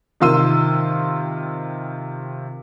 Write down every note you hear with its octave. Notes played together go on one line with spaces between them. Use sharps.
C3 D#3 F4 C6 E6 D#7